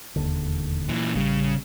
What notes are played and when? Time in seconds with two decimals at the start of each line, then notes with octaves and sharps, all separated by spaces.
0.16 E1 D#2 D3
0.89 A#2 E3
1.15 A1 C#3 G3